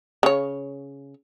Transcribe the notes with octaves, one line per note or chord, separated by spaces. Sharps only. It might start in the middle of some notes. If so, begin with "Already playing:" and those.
C#3 C#5